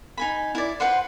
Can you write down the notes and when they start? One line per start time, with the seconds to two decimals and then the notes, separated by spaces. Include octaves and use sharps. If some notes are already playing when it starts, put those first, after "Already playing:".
0.17 D#4 G#5 B5
0.55 E4 D5
0.80 B4 C5 F#5 C6